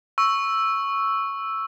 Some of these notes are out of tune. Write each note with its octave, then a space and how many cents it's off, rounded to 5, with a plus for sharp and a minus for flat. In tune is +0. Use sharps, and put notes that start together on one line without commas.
C#6 +0 E6 +0